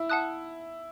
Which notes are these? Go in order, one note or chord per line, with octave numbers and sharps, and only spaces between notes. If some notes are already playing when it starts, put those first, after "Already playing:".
Already playing: E4
F#5 A5 D#6 F#6